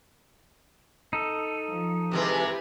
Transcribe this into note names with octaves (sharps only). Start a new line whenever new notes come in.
D#4 A4
F3
C3 E3 G#3 G4 B4